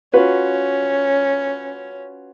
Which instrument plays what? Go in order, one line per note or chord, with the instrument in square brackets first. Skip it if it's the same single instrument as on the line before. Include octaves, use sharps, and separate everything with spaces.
[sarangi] C#4 [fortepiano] F4 F#4 B4